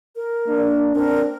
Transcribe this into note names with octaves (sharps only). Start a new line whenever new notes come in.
A#4
A#3 D4
C4 D4 A#4